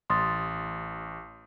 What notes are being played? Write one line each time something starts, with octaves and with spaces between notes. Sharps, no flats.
A1 C6 D#6 A6